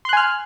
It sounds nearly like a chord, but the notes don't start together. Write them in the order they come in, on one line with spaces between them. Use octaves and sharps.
C6 F#6 G#5 F6